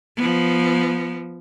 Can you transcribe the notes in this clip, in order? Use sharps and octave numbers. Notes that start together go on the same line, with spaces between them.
F3 B3